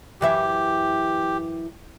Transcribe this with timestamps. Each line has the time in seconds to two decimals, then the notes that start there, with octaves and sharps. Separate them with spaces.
0.21 F#2 E3 G4 E5